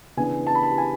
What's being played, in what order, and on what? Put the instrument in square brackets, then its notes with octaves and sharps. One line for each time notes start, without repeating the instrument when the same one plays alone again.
[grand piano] C#3 E3 B3 D4 G#5
A5
B5
A5
G#5